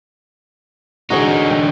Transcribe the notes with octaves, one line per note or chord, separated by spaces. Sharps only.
D3 D#4 F#4 G#4 C#5
G5